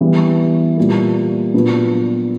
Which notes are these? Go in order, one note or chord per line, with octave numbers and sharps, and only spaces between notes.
E3 G3 B3 E4 G4
A#2 G3 A#3
A#2 F#3 B3 D4